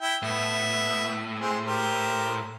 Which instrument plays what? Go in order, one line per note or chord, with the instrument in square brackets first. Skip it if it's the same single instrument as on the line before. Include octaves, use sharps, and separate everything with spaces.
[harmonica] E4 G5
[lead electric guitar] A2 [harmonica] B3 E5
[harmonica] G#3 C4 G#4
G4 A#4 C5